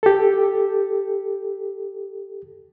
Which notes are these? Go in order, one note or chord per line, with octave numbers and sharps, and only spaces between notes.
G4 A4